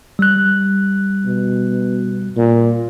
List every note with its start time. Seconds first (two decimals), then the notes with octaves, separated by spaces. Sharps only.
0.19 G3 F#6
1.25 B2
2.37 A#2